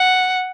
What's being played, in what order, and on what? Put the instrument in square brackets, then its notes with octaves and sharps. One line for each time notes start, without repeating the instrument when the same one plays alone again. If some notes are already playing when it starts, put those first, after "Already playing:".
Already playing: [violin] F#5